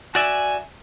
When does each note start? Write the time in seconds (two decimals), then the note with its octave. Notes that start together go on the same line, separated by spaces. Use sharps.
0.15 F#4 D5 E5 G#5